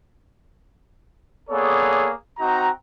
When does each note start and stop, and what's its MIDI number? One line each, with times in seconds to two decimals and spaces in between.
1.50 2.11 58
1.50 2.11 59
1.50 2.11 68
1.50 2.11 69
1.50 2.11 73
1.50 2.11 74
2.38 2.68 60
2.38 2.68 63
2.38 2.68 66
2.38 2.68 82